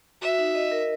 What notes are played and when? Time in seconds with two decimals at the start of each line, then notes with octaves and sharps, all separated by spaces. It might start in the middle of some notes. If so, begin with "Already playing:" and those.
0.22 F#4 E5
0.38 D#4
0.55 D#5
0.71 A#4